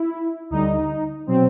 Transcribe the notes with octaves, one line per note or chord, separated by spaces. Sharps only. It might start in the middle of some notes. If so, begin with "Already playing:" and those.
Already playing: E4
D2 D3 G3 D#4
B2 F#3 C4